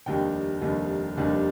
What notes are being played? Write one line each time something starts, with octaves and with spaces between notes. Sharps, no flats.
F1 D#2 D#3 G3 D4 G5
F1 D#2 D#3 G3 D4
F1 D#2 D#3 G3 D4